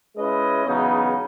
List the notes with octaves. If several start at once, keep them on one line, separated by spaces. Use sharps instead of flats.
G#3 C#4 E4 B4 D#5
E2 C#3 F#3 B3 D#4